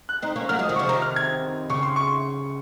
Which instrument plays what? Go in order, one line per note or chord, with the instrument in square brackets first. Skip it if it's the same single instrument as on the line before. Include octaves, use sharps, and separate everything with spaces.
[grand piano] F#6
[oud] C4 D#4
A#3 C#4
[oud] F#3 A#3 [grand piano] F6
[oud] F3 G#3 [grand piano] D#6
[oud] D#3 F#3
[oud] C#3 F3 [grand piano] C#6
[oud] C3 D#3 [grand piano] A#5
[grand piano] F6
G#6
[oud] C#3 [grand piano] C#6
[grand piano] C6
C#6